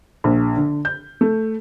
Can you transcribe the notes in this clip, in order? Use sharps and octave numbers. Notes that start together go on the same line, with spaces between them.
A#1
D3
G6
A3